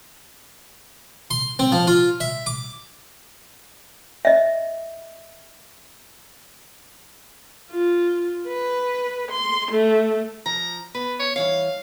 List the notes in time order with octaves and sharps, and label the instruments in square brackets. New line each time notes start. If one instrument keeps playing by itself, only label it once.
[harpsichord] C6
C4
F3
F4
E5
D6
[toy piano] D#5 E5
[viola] F4
B4
C6
A3
[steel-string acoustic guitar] F3 [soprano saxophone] A#5
[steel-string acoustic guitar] B3 [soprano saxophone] B4
[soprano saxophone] C#5
[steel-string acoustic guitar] G2 E3 C#5 [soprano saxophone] F5